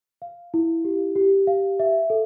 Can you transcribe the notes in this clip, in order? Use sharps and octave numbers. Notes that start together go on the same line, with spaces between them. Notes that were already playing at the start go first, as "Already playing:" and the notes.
F5
E4
G4
G4
F5
E5
A4